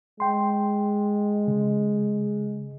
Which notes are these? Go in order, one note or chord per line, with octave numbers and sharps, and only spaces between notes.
G#3 G5 C6
C#3